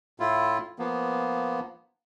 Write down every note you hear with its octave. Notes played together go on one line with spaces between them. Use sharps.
A2 E4 F4
F3 A#3 B3